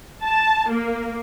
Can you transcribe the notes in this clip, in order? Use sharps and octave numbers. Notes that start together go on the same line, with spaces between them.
A5
A#3